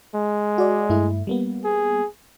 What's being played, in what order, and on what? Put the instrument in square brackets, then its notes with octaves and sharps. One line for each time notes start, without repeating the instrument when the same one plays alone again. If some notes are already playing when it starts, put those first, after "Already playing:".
[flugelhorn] G#3
[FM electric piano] F#4 D5
G2 A3 E4
G3 A#3 B3
[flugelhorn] G#4